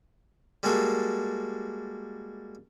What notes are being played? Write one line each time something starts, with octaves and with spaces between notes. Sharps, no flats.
G3 G#3 A#3 F#4 A4